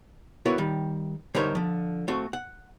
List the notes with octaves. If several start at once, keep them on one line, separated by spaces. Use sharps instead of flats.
B3 E4 F#4 A#4 C#5
D#3 G3
D3 G3 D#4 A#4 C5 C#5
D3 F3
A3 C4 F#4
F#5